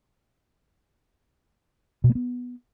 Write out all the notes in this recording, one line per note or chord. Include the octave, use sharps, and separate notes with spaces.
B2
A#3
B3